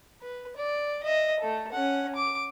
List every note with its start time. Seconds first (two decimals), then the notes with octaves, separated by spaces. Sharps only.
0.22 B4
0.57 D5
1.03 D#5 E5
1.40 A3 A4
1.72 C#4 F#5
2.16 D6